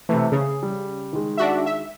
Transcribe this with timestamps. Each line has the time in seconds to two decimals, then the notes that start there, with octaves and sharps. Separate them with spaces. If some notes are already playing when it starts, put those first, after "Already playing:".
0.09 C3 E3 A3
0.32 C#3 G#4
0.63 G3
1.13 D#3 G#3
1.38 D4 F#4 E5
1.66 E5